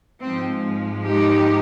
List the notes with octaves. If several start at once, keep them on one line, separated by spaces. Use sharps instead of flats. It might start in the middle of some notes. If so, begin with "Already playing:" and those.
G#2 F3 G#3 C4
D#4 G4